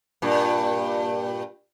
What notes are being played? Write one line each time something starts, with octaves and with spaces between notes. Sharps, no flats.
G2 A#2